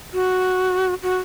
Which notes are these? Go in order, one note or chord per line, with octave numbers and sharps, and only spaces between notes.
F#4
F#4